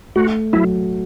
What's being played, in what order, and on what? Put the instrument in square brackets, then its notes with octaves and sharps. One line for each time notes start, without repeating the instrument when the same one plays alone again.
[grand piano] A3 [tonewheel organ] F#4
[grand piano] F#3 [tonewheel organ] E4